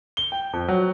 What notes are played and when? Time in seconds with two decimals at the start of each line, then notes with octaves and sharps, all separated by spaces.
0.17 G7
0.32 G5
0.53 F2
0.68 F#3